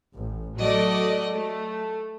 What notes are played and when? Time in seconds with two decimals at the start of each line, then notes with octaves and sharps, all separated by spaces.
0.13 A1
0.59 F#3 A3 F#4 A4 D5 D#5
1.32 A3